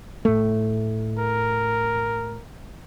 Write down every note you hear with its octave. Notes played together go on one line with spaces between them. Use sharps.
A2 A3
A#4